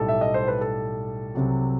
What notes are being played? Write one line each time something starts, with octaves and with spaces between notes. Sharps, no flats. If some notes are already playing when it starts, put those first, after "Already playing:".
Already playing: B1 A2 G3 A4
E5
D#5
C5
B4
A4
C2 C3 F#3